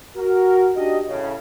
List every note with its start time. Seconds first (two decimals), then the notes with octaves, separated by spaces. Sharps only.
0.17 F#4 A#4
0.76 D4 D#4 F#4 G4 D#5
1.09 A2 C#3